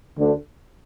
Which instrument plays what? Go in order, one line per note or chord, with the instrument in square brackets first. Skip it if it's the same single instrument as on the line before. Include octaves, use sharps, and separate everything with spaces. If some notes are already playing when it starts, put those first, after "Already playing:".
[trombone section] D2 D3